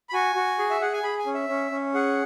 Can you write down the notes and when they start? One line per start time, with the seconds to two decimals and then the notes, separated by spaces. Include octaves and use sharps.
0.09 B5
0.13 F#4 G#5
0.36 F#4
0.59 G#4
0.71 E5
0.81 G#4 F#5
0.93 G#5
1.03 G#4 B5
1.19 G#5
1.26 C#4
1.34 E5
1.49 C#4
1.71 C#4
1.94 G#4 F#5